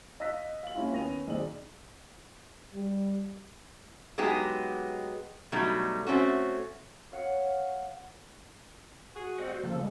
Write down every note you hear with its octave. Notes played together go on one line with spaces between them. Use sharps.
D#5 F5 E6 F#6 A#6 B6
F5 F#7
A#3 C#4 E4 F4
D#2 B3 C#4 A#6 D#7 F7
B1 D#3 G#3 C4 D5 F#7
G3
F#3 G#3 B3 D#4 G4 G#4
B2 F#3 G3 A3 D#4
A3 C4 C#4 F#4
C#5 F5 F#5
F#4 G#4
G3 A3 C4 D#5 F#5
F#4 C5
C#3 F3 A#3 A4
G3 G#3